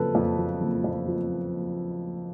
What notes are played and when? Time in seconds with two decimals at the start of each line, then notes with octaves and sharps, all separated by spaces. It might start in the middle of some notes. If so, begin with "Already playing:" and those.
Already playing: F#1 F2 C#3 F3 A4 B4
0.15 F2
0.38 F3
0.61 F#1
0.84 F2
1.08 F3